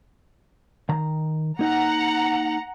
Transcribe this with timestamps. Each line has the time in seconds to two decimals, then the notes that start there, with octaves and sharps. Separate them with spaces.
0.89 D#3 A#5
1.59 A#3 D#4 F#5 A#5